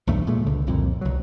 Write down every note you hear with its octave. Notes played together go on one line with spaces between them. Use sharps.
B1 E2 G2 A3
A#2 G#3 A3
C#2 D3
C2 F2 A#2
C2 F#3